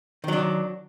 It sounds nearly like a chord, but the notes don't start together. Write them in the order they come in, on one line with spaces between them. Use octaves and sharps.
D#3 F#3 D4